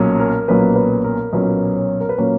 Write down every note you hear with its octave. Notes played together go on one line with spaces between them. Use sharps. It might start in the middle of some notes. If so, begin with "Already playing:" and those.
Already playing: B1 A#2 F#3 A#3 C#4
A#4
B1 A#2 F#3 A#3 C#4 B4
B4
A#4
B1 A#2 F#3 A#3 C#4 B4
C#5
A#4
B4
A#2 F#3 A#3 C#4 C#5